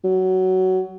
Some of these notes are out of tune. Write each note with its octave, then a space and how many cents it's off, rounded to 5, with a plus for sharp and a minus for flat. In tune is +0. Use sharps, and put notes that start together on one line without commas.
F#3 +15